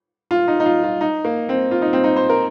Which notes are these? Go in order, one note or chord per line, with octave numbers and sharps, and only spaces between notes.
F4
D#4
D#4
F4
F4
D#4
A#3
C4
F4
D#4
C4
D#4
C5
A#4